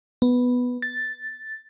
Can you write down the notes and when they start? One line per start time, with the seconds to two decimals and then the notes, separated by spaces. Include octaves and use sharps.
0.22 B3
0.82 A6